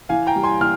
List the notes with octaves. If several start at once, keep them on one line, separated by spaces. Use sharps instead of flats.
E3 F5 G#5
G5 A#5
G3
G#5 C6
E3 F6